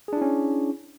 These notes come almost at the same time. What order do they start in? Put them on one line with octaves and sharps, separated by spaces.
G#4 D4 E4 C#4